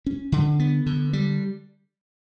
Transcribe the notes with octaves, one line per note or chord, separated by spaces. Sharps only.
C#4
D3
B3
D3
G3